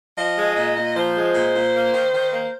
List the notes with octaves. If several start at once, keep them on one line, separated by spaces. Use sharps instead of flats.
F3 D#5
G#3
A#2
A#2
F3 C5
G#3
A#2
A#2
A#3
D#3
D#3
A#3